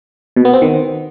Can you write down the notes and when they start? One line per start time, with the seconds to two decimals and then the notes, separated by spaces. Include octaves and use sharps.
0.36 B2
0.45 B3
0.53 C4
0.62 D#3